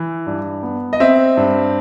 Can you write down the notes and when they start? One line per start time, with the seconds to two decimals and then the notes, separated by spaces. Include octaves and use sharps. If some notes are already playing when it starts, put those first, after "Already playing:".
Already playing: E3
0.27 G2
0.63 B3
0.93 D#5
1.00 C4 E5
1.37 G2